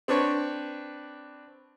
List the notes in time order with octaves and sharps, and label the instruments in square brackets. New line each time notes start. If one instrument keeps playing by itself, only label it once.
[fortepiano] C4 D4 B4 C#5